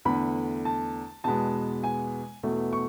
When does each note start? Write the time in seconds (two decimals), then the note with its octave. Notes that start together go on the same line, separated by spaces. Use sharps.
0.05 E2 D3 A3 B5
0.65 A5
1.24 E2 B2 G#3 B3 A5
1.84 G#5
2.43 E2 B2 A3
2.73 C#6